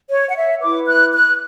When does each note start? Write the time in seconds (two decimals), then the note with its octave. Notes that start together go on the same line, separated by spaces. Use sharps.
0.10 C#5
0.29 F#5
0.36 E5
0.61 E4 B4 D6
0.87 F#6
1.13 F#6